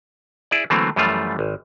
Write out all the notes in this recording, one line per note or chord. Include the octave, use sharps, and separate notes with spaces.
E4 G#4 D5
D3 E3 F#3 A3 A#3 C4
F#2 E3 F3 G3 A3 F4
G#1